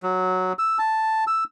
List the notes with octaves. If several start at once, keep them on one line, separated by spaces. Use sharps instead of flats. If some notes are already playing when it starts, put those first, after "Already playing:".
F#3
E6
A5
E6